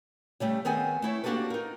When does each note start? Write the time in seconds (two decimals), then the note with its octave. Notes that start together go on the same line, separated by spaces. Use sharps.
0.40 C#3 G3 A3 G4
0.65 D#3 B3 C4 G#4 G#5
1.02 A3 E4 C#5
1.24 A#3 D4 F#4 G4 A4 B4
1.50 D#4 A#4